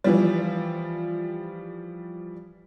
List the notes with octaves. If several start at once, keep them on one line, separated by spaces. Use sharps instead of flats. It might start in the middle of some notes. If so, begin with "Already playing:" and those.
E3 F3 G3